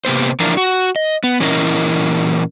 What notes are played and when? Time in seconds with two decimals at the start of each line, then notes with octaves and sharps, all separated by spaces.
0.05 C3 A#3 B3 C5
0.40 E3 F3 D4 F4 A#4
0.57 F#4
0.96 D#5
1.24 B3
1.40 A#2 E3 C#4 E4 A#4 D#5